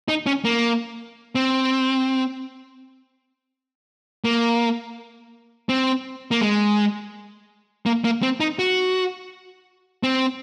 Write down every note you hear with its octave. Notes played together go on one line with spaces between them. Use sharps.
D#4
C#4
A#3
C4
A#3
C4
A#3
G#3
A#3
A#3
C4
D#4
F#4
C4